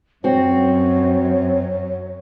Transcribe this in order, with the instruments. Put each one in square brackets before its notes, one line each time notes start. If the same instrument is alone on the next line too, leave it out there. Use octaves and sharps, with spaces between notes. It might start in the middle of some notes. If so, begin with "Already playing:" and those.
[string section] F#2 [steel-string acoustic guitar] C4 F#4 [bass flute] C#5